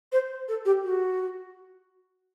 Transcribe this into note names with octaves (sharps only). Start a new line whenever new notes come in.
C5
A4
G4
F#4